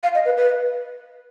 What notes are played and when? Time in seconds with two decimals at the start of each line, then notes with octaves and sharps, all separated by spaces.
0.03 F5
0.15 D#5
0.25 B4
0.37 B4